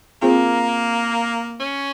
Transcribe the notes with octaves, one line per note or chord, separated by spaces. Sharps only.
A#3 C4 F4 G#4 C5
C#4